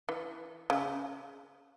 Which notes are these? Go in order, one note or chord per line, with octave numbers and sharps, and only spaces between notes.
E3
C#3